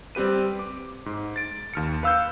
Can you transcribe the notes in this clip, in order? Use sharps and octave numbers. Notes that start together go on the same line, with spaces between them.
G3 C4 G4 B4 D#7
D6
G#2
A6 D7
D#2 F6 C#7
B4 F5 E6 F6 G6